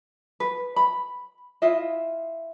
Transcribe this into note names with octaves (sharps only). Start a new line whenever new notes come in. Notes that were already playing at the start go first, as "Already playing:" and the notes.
B4
B5
E4 F4 D#5 E5